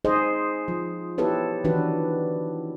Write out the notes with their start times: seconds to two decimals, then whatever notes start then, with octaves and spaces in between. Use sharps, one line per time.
0.05 D#4 G#4 C5 D#5
0.68 F3
1.18 B3 E4 G4 A4 B4 C#5
1.64 D#3 E3 D4 F#4 B4